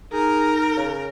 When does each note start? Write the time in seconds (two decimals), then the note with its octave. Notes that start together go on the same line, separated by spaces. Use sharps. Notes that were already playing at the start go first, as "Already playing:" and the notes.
0.13 D#4 G#4 A#4
0.77 C#3